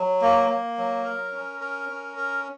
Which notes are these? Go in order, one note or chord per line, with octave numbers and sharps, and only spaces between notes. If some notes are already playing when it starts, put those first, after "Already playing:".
Already playing: F#3
A#3
A#3
F#3
A#4
C#4
A#4
C#4
A#4